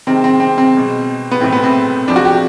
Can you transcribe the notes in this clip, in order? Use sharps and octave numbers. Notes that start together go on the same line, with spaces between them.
C3 D#3 G#3 C4
C4
C4
C4
B2 G#3
B3
A2 E3 A3 C4
B3
C4
E2 C3 F3 G#3 D4
F#4
G4